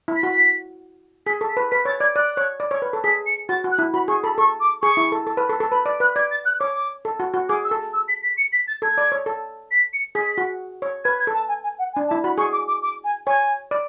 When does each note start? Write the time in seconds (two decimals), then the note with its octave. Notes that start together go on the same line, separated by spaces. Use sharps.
0.08 E4
0.16 B6
0.23 F#4
1.26 G#4 B6
1.41 A4
1.49 B6
1.57 B4
1.71 B4 B6
1.85 C#5 A6
2.00 D5 G#6
2.16 D5 F#6
2.37 C#5
2.60 D5
2.71 C#5
2.82 B4
2.93 A4
3.04 G#4 B6
3.26 C#7
3.49 F#4 A6
3.64 F#4
3.71 F#6
3.79 E4
3.93 F#4 B5
4.08 G#4 C#6
4.23 A4 B5
4.38 A4 C#6
4.60 D6
4.82 G#4 C#6
4.97 E4
5.12 A4
5.27 A4
5.37 B4
5.49 A4
5.60 A4
5.71 B4 B5
5.86 D5
6.00 B4 F#6
6.16 D5 G#6
6.31 A6
6.45 F#6
6.60 C#5 D6
7.05 A4
7.20 F#4
7.34 F#4
7.49 G#4 D6
7.64 E6
7.71 A4
7.93 E6
8.08 B6
8.23 B6
8.38 C#7
8.53 B6
8.68 A6
8.82 A4 G#6
8.98 D5
9.12 C#5
9.26 A4
9.71 B6
9.93 C#7
10.15 G#4 B6
10.38 F#4
10.82 C#5
11.05 B4 G#6
11.20 G#6
11.27 A4
11.34 A5
11.49 G#5
11.63 G#5
11.79 F#5
11.93 G#5
11.97 D4
12.08 A5
12.11 E4
12.23 F#4 B5
12.38 G#4 C#6
12.52 D6
12.68 D6
12.82 D6
13.04 G#5
13.26 C#5 G#5
13.71 D5